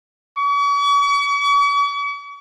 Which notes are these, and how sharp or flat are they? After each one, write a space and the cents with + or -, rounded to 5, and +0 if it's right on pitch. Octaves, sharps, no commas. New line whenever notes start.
C#6 +45